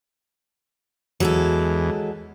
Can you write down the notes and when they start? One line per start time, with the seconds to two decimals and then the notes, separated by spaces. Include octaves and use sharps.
1.20 E2 F#3 G#3 A4